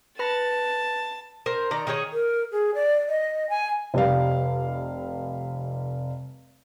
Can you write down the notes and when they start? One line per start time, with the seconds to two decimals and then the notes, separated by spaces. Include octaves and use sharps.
0.19 B4 A5 B5 A#6
1.46 A#4 C5
1.71 D#3 D5 A#5
1.87 D#3 D#4 G#4 C#5
2.13 A#4
2.52 G#4
2.75 D5
3.09 D#5
3.50 G#5
3.94 F1 G3 F5